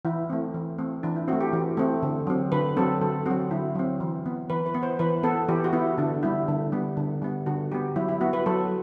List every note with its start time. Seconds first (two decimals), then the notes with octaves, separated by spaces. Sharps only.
0.05 E3 E4
0.30 A3 C4
0.54 E3
0.78 A3 C4
1.03 E3 D4
1.16 E4
1.28 A3 C4 F#4
1.41 G4
1.53 E3
1.77 A3 C4
2.03 D3
2.27 F#3 C4
2.52 D3 B4
2.77 F#3 C4 A4
3.01 D3 A4
3.26 F#3 C4 F#4
3.51 D3 E4
3.75 F#3 C4
4.00 E3
4.26 B3
4.50 E3 B4
4.66 B4
4.74 B3
4.83 C5
4.99 E3 B4
5.23 B3 A4
5.48 E3 G4
5.64 F#4
5.73 B3 E4
5.98 D3 D4
6.23 G3 B3 E4
6.48 D3
6.72 G3 B3
6.97 D3
7.22 G3 B3
7.46 D3 F#4
7.72 G3 B3 G4
7.96 F#3 E4
8.09 E4
8.21 B3 F#4
8.33 B4
8.46 F#3 A4